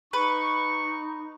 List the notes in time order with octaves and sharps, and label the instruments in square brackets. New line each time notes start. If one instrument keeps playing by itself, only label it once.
[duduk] D#4 [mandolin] B4 [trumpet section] C#6